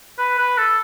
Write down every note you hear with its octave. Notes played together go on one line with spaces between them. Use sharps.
B4
B4
A4